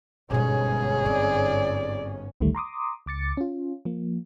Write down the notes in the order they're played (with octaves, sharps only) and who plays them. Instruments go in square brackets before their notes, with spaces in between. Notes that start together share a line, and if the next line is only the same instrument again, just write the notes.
[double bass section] G1 G#2 C#4 [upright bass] B2 G#3 [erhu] G#4
[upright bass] C4 [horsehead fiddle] D5
[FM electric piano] A1 D2 D#3 G3 A3
A#5 C6 D6 D#6
C#2 D6 A6 C#7
C#4 F4
F3 A#3